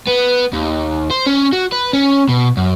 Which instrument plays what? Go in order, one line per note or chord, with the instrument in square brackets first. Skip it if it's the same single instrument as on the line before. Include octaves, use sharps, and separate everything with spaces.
[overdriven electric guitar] B3
D#2
C5
C#4
F#4
B4
C#4
B2
F#2